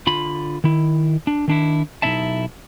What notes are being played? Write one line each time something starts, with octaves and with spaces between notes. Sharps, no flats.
D3 F4 B5
D#3 E4
D4
D#3 D4 E4
B1 G#3 D#4 E4 E5 A5